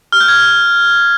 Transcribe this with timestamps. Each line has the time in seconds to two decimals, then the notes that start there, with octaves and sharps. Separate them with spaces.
0.12 F6
0.20 G6
0.28 G#6